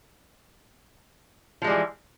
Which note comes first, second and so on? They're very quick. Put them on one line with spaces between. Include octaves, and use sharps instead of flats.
F3 G#3 G3 E3